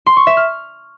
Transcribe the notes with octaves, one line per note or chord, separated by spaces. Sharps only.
C6
C#6
E5
F6